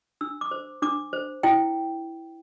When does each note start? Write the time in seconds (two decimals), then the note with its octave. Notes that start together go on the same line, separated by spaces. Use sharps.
0.21 D4 E6
0.41 D6
0.51 C5
0.82 D4 D6
1.13 C5
1.43 E4 G5